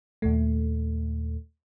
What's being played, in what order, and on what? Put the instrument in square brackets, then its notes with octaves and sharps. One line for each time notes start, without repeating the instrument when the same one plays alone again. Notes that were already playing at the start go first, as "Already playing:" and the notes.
[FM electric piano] D#2 A#2 A3